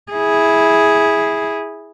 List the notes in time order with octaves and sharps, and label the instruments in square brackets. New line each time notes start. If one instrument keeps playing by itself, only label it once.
[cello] E4 G#4